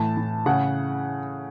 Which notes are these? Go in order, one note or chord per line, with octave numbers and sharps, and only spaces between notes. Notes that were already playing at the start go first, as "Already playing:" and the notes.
Already playing: A2 E3 A5
A2
C#3 F#5